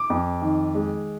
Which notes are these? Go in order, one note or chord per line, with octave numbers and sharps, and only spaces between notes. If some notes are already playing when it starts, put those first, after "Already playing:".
Already playing: D6
F2
D#3
G#3